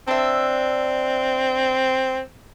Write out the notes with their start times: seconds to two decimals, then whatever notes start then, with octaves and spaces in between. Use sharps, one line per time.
0.08 C4 D4 E5